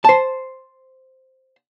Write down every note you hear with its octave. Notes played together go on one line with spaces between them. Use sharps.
C5 A5